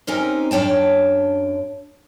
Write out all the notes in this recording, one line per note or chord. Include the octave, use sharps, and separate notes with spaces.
C4 C#4 D#4 G4 A#4 C5
F#2 D4 C#5 G5 A5